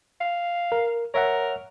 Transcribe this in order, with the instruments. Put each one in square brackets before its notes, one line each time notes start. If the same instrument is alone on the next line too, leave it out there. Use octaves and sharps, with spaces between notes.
[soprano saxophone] F5
[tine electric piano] A#4
[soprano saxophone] A#4 [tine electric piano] C#5 E5 F#5